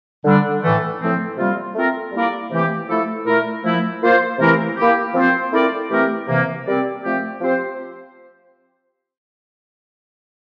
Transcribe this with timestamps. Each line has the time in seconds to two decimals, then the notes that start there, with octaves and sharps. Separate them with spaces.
0.24 D3 G3 D4
0.63 A2 E3 A3
1.00 A2 F3 A3 C4
1.38 C3 G3 A#3 F4
1.75 A3 C4 F4 A#4
2.13 G3 A#3 E4 A#4 D5
2.51 C3 E3 A3 E4 G4
2.89 F3 A3 E4 A4
3.26 A#2 A3 E4 A#4
3.64 F3 A3 E4
4.02 A#3 F4 C5
4.39 C3 E3 A3 E4 A#4
4.77 A#3 E4 G4
5.15 F3 C4 F4 C5
5.52 A3 C4 E4 A#4 D5
5.90 E3 A3 C4 G4 A#4
6.28 C3 E3 A#3
6.65 G3 C4 G4 A#4 D5
7.02 F3 A3 C4 G4
7.41 F3 C4 G4 C5